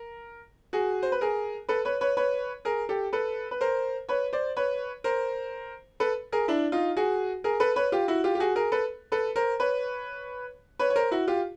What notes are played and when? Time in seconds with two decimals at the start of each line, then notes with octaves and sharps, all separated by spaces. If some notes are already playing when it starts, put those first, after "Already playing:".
Already playing: A#4
0.73 F#4 G#4
1.03 C5
1.12 B4
1.21 G#4 A#4
1.69 A4 B4
1.85 B4 C#5
2.01 B4 C#5
2.17 B4 C#5
2.65 G#4 A#4
2.89 G4 A4
3.13 A4 B4
3.51 B4
3.61 A#4 C5
4.09 B4 C#5
4.33 C5 D5
4.57 B4 C#5
5.04 A#4 C5
6.00 A4 B4
6.32 G#4 A#4
6.48 D4 E4
6.72 D#4 F4
6.97 F#4 G#4
7.44 G#4 A#4
7.60 A4 B4
7.76 B4 C#5
7.92 F4 G4
8.08 E4 F#4
8.24 F4 G4
8.35 G4
8.40 F#4 G#4
8.56 G#4 A#4
8.72 A4 B4
9.12 A4 B4
9.36 A#4 C5
9.60 B4 C#5
10.79 B4 C#5
10.90 C#5
10.96 A#4 C5
11.11 E4 F#4
11.28 F4 G4